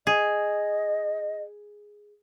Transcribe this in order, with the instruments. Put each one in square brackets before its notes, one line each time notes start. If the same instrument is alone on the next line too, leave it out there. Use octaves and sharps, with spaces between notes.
[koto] G#4 [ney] D#5